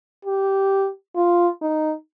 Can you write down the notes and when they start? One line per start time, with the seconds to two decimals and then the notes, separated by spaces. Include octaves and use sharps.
0.25 G4
1.16 F4
1.62 D#4